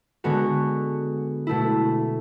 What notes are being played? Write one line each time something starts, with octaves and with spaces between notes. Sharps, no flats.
D3 G#3 B3 F#4
B2 A3 E4